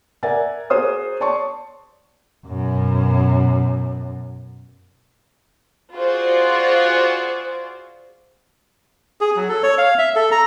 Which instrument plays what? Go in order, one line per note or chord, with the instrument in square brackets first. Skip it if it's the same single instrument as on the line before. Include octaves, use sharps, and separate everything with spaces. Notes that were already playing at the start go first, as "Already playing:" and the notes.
[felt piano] A#4 D5 E5 F#5 G#5 A6
F#4 G#4 A#4 C5 D#6
C#5 D5 A5 C6 C#6
[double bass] F#2 B2
[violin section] F4 F#4 G#4 C5 D5
[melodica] G#4
F#3
A4
C#5
F5
E5
A4
A#5